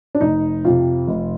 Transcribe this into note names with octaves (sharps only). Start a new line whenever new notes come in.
D4
F1 D#4
F2 C3 F4
F1